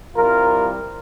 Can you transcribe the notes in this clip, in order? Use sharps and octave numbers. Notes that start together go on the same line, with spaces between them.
C2 C3 G3 F4 A#4